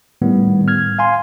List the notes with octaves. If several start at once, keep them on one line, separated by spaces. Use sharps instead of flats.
A2 D#3 G3 B3
F6 G#6
F5 G#5 C6